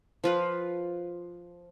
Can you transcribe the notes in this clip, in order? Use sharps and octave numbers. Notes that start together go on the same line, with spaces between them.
F3 F4 B4